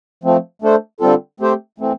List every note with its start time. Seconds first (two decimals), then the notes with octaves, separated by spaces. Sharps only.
0.23 F3 A3 C4
0.62 A3 D4 A4 C5
1.00 D3 G3 C4 F4 A4
1.40 A3 C4 G4 C5
1.78 E3 A3 C4